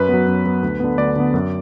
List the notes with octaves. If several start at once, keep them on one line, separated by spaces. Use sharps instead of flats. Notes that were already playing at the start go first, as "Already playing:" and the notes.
Already playing: F#2 B4
F#3 B3
F#2
F#3 B3
D2
D3 B3
D2 D5
D3 B3
F#2